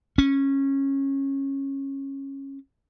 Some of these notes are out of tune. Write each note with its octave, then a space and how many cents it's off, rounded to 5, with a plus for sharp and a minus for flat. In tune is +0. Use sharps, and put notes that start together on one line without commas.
C#4 -20